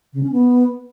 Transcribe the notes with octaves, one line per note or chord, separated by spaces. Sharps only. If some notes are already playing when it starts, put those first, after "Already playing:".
C#3
C#4
B3